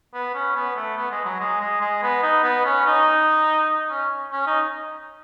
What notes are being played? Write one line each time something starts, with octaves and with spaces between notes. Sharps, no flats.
B3
C#4
B3
A3
B3
G#3
F#3
G#3
G#3
G#3
B3
D#4
B3
C#4
D#4
C#4
C#4
D#4